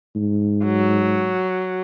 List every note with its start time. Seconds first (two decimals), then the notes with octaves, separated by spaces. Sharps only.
0.15 G#2
0.64 F#3